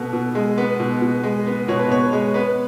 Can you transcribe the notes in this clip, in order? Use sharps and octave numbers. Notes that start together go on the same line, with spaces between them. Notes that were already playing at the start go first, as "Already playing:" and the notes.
Already playing: B2 B3 A4
B2
G#3
B3
B2
B2
G#3
B3
B2 C#5
B4
B2 C#5
G#3
B3 B4